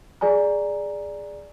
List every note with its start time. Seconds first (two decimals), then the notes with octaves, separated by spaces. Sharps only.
0.21 G#4 D5 G#5 A#5